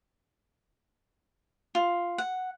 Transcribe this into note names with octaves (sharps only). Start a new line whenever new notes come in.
F4
F#5